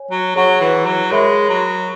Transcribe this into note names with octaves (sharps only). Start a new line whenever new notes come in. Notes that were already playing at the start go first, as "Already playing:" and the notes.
Already playing: C#5 G#5
F#3
F#3 G#4 C#5 F#5 C#6
E3
F#3
G#3 A#4 C#5 E5 B5
F#3